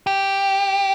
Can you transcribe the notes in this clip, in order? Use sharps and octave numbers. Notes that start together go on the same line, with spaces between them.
G4